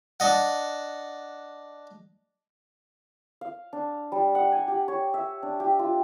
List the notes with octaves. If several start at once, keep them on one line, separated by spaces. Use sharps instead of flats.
D4 D#5 F#5
F5
D4
G3
F#5
G#5
G4
C#5
E5
D4
G4
F4